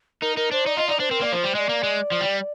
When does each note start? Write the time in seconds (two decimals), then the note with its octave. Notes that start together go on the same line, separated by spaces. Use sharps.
0.22 D#4 A#4
0.37 D#4 A#4
0.51 D4 C5
0.66 D#4 D5
0.77 F4 D#5
0.88 D#4 D5
1.00 D4 C5
1.11 C4 A#4
1.21 A#3 D5
1.32 F3 C5
1.44 G3
1.55 G#3 D5 D#5
1.69 A#3
1.83 G#3
2.12 F3
2.21 G3